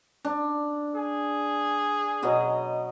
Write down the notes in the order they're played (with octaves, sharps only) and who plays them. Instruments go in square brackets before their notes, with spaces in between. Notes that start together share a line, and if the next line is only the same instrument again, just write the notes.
[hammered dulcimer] D4
[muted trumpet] G#4
[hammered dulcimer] B2 F#3 D#5